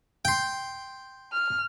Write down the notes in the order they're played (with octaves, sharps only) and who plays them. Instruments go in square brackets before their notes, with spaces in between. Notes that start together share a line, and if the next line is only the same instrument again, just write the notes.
[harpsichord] G5 C6
[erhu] F6